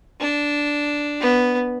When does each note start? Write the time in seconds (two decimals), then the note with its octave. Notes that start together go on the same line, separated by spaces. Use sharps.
0.20 D4
1.21 B3